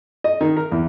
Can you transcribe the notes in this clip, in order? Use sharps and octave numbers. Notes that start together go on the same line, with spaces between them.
D#5
D#3
A#4
E2